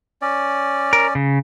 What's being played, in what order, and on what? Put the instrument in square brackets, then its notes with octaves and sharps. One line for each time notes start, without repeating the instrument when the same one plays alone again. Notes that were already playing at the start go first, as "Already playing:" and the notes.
[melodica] C#4 D5
[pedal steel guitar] A#4
C#3